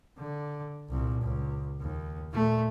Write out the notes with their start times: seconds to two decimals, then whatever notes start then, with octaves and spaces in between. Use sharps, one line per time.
0.18 D3
0.90 C2 A#2
1.22 C#2
1.80 D#2
2.32 A#2 A3